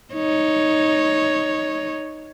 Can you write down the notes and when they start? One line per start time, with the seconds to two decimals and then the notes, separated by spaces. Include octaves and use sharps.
0.13 D#4 C#5